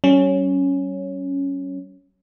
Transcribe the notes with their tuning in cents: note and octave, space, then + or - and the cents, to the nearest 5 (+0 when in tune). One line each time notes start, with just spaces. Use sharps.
G3 -45 C#4 +0